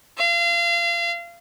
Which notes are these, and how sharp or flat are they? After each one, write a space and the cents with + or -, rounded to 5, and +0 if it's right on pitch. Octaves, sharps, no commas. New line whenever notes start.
F5 -30